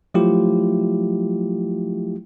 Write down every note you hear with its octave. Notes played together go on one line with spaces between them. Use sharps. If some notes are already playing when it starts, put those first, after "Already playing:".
F3 F#3 A3 E4 F4 G4